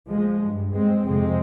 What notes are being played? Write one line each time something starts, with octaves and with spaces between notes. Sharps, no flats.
F3 G#3
G2
G#3 C4
F2 C3 G#3 C4